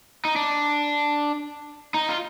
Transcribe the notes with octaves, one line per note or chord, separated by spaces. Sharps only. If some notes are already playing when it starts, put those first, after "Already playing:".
D#4
D4
D#4
F4